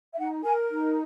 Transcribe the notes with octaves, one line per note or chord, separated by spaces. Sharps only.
E5
D#4 F#5
A#4 G#5
D#4